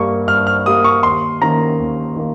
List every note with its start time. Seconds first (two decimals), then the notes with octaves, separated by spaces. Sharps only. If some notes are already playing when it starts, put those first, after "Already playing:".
Already playing: G2 G3 A#3 C#6
0.28 G2 F6
0.47 F6
0.66 G3 A#3 D#6
0.84 C#6
1.03 D#2 C6
1.41 D#3 A#3 C#4 A#5
1.79 D#2
2.16 D#3 A#3